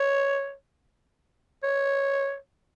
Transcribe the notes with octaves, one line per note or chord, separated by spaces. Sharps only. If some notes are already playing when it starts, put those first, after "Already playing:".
Already playing: C#5
C#5